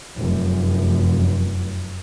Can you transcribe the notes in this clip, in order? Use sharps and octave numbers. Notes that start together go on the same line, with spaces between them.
F1 F#2